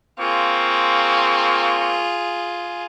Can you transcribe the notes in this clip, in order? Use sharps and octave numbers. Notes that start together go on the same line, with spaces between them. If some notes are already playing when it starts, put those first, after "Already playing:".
A#3 C4 F4 G#4 C#6